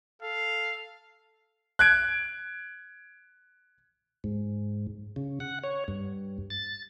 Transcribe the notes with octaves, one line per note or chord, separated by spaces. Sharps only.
A4 F5
F#6 G#6 D7
G#2
C#3
F#5
C#5
G2
A6